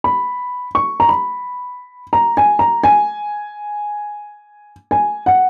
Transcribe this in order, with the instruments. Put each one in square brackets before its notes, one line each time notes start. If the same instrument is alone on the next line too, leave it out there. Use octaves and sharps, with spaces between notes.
[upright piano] B5
C#6
A#5
B5
A#5
G#5
A#5
G#5
G#5
F#5